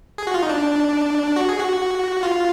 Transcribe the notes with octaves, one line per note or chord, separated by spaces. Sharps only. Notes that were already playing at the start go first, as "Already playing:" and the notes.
G#4
F#4
F4
D#4
D4
F#4
G#4
F#4
F4